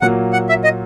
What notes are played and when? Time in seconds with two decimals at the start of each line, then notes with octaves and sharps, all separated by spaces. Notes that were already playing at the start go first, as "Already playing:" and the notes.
0.01 A#2 F#3 A#3 F#5
0.33 F#5
0.49 E5
0.64 D#5